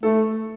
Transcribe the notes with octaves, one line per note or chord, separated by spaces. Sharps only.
A3 A4